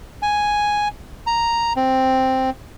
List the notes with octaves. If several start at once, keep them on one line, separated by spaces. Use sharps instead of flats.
G#5
A#5
C4